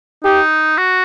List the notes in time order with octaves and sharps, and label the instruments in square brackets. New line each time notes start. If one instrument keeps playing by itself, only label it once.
[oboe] D#4 [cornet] G4
[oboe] F#4